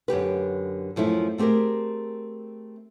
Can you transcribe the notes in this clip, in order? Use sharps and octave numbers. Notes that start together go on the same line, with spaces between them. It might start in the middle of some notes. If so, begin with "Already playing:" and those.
F#2 D3 G4 B4
F#2 F3 A3 E4
A3 C4 G4 G#4 A#4